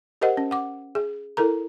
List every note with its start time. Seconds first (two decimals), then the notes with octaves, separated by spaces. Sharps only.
0.21 G4 A#4 C5 D#5 F#5
0.37 C#4
0.51 F#5 D6
0.95 G#4
1.37 E4 A4 A#4 A#5